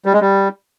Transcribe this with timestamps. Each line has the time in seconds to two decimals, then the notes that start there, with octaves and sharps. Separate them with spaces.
0.05 G3
0.13 G#3
0.21 G3